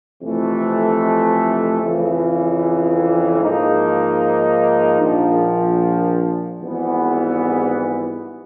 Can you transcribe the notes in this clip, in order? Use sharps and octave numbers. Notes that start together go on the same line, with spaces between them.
F2 C3 E3 A3
F2 C#3 E3
G#2 F3 A#3 D#4
A#1 A#2 F3
G#1 G#2 E3 G3 B3